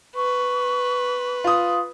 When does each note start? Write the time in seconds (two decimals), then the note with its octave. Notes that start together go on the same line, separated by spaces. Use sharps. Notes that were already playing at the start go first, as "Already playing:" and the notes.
0.16 B4 C#6
1.44 F4 D#6